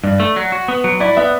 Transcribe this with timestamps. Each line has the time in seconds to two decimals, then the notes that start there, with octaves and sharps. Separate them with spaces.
0.04 G2 D5
0.20 A3
0.36 F#3
0.52 F#4
0.68 B3
0.84 F#3
1.00 E4 D5
1.17 B3 E5